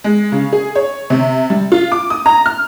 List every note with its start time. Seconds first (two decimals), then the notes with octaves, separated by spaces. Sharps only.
0.04 G#3
0.32 C#3
0.53 G#4
0.75 C#5
1.10 C3
1.50 G3
1.72 F4
1.92 D6
2.10 D#6
2.26 A#5
2.46 F6